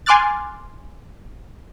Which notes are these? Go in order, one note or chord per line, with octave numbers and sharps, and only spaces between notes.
G#5 C6 D6 F6 F#6 A6